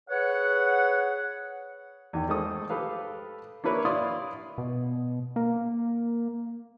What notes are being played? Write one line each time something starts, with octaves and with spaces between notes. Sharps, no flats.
G#4 B4 C#5 F#5
E2 D#3 G5
G#3 A3 A4 C5 D#6
G4 A4 B4 F5
A#3 D4 E4 B4 C#5
E4 D5 F5 C6 D#6
B2
A#3